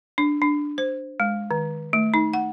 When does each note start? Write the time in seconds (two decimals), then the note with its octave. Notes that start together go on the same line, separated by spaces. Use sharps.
0.18 D4
0.42 D4
0.78 C5
1.20 G#3
1.51 D#3
1.93 A3
2.14 D#4
2.33 F#5